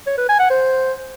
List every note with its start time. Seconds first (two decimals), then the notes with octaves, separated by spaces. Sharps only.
0.07 C#5
0.18 B4
0.29 G#5
0.40 F#5
0.51 C5